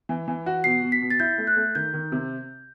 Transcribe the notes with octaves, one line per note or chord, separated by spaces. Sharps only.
E3
E3
F#4
B2 C7
B2
B6
B2
A6
E4 G6
A3
F#6
A3
D#3 G6
D#3
C3